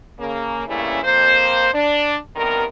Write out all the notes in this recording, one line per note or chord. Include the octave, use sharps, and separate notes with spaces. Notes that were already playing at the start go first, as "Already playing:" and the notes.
C#3 A#3
G2 C#3 A3 A#3 C#4 E4
F2 A#3 C5
D4
G2 C3 D#3 B3 A#4